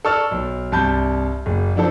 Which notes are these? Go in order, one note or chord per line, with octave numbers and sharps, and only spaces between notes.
A4 D5 C#6 E6 F6 A6
B1
C2 G2 A5 B5 G6
F#1
F3 F#3 D4 E4 A4 C5